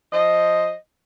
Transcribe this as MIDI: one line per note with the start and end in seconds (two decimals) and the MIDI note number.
0.13 0.73 53
0.13 0.73 72
0.13 0.73 75